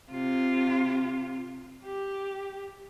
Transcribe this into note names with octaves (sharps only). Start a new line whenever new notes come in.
C3 F4
G4